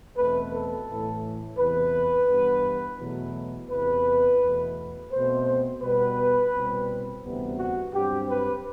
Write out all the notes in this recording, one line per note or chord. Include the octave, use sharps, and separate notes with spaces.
E2 B2 A3 C4 B4
A4
A2 E3 A3
E2 C3 E3 B4
G2 E3 B3
E2 B2 F#3 A3
E2 C3 E3 B4
E2 B2 A3
B2 A3 C4 C5
B2 G3 B3 B4
C2 B2 G3 C4
D2 C3 E3 G3 B3
F#4
G2 F#3 C4 G4
B4